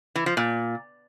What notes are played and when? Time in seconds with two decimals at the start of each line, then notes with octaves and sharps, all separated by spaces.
0.15 E3
0.26 F3
0.37 A#2